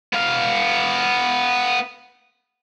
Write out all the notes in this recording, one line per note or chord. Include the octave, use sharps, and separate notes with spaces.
B3 F5